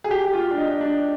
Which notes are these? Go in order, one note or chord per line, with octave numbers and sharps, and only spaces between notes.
G#4
G4
F4
D4
D#4
D#4
D4